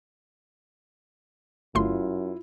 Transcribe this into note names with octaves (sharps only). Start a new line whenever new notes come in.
G1 F#2 A3 E4 F4 C6